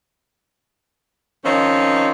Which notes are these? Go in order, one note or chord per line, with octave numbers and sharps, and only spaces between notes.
D#3 F3 C4 C#4 D#4